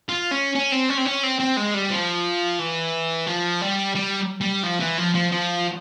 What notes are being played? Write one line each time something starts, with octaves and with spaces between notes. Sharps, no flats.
F4
C#4
C#4
C4
C#4
C4
C#4
C4
C4
G#3
G3
F3
E3
F3
G3
G3
G3
F3
E3
F3
F3
F3